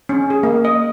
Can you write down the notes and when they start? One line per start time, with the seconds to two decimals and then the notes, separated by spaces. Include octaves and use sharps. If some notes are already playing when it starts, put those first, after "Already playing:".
0.09 C#4
0.30 G#4
0.43 A#3
0.65 D#5